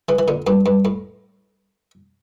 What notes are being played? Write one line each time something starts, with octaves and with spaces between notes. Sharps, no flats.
C#3 E3
E3
A#2 D3
G2 A#2
G2
A2